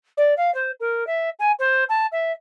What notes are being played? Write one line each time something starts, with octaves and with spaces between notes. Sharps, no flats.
D5
F5
C5
A#4
E5
G#5
C5
A5
E5